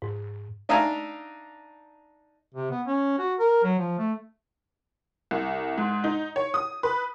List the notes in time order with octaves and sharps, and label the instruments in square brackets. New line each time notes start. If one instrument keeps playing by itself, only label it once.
[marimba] G#2
[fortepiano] D4 D#4 E5 F5 G#5 A#5
[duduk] C3
B3
C#4
F#4
A#4
F#3
F3
A3
[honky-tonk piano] C2
G#2
D#4
C#5
D#6
B4